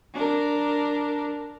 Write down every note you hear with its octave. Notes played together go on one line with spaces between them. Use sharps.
D4 A#4